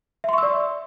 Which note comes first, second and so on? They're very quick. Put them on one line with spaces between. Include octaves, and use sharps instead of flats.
E5 C6 C#6 E6 D5